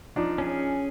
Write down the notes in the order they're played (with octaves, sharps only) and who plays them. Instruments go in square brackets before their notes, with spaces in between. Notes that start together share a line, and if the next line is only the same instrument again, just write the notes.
[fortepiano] F3 D4 D#4
[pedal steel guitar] C#4 G#4